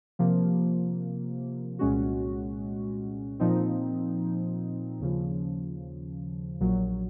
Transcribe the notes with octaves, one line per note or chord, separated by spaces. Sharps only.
C3 F3 A#3
C2 A#2 G#3 C#4 F#4
A#2 F3 C4 D#4
D#2 C#3 F3
A#1 A#2 F#3